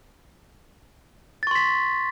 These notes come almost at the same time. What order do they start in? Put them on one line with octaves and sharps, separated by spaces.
A6 C#6 C6 B6